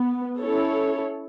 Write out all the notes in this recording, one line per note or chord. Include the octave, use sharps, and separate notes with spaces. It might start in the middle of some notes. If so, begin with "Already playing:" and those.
Already playing: B3
C#4 E4 A4 C#5